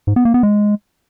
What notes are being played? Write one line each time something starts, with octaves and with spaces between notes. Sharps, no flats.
G#2
B3
A#3
B3
G#3